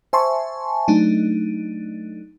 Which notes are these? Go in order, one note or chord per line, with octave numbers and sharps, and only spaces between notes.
C5 E5 G#5 A5 C6 C#6
F#3 A3 D4 D#4